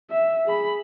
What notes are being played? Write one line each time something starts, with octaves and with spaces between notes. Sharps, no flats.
E5
G#4 B5